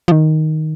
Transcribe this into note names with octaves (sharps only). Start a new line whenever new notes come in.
F3
D#3